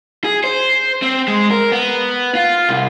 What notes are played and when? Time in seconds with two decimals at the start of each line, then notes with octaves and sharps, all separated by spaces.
0.24 G#4
0.44 C5
1.02 C4
1.28 G#3
1.51 A#4
1.72 B3
2.35 F4
2.69 C2